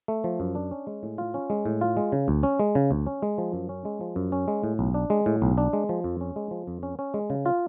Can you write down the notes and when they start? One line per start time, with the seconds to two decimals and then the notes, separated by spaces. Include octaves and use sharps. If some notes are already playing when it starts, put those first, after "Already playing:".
0.08 A3
0.24 F3
0.40 F#2
0.55 D4
0.71 C#4
0.87 G#3
1.03 A2
1.18 F4
1.34 C#4
1.50 G#3
1.66 A2
1.81 F4
1.97 G#3
2.12 C#3
2.28 D2
2.43 C#4
2.60 G#3
2.75 C#3
2.91 D2
3.06 C#4
3.22 G#3
3.38 F3
3.54 F#2
3.69 C#4
3.85 G#3
4.01 F3
4.16 F#2
4.32 C#4
4.48 G#3
4.64 A2
4.79 B1
4.94 D4
5.10 G#3
5.26 A2
5.42 B1
5.58 D4
5.73 G#3
5.89 F3
6.04 F2
6.21 C#4
6.36 G#3
6.51 F3
6.67 F2
6.83 C#4
6.99 C#4
7.14 G#3
7.30 C#3
7.46 F4